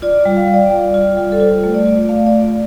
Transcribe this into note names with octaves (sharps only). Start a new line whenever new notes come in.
F4 D5
G3
F5
F4
D5
G3
F4
G3
A4
F4 C5
A3
D5
F4
D5
A3 F5
D5
F4
F5
D5